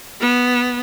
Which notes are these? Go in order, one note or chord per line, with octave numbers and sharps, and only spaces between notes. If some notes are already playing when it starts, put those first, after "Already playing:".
B3